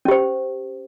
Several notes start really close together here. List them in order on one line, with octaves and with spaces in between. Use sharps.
C#4 G4 C5